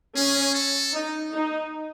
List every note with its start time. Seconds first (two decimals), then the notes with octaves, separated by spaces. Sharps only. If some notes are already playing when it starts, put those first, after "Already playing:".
0.16 C#4 G#4
0.55 A4
0.93 D#4
1.31 D#4